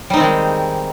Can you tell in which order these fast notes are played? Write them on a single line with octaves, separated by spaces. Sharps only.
G3 D#4 C4 D#3 G#3